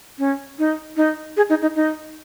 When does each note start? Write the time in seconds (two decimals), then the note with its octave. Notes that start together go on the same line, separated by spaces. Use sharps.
0.19 C#4
0.59 D#4
0.97 D#4
1.37 G#4
1.50 D#4
1.62 D#4
1.76 D#4